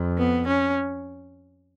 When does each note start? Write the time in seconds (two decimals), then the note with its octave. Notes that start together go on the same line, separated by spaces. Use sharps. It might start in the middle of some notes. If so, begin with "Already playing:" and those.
Already playing: F2
0.18 B3
0.47 C#4